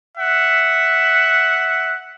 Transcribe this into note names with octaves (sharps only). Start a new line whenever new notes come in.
E5 F#5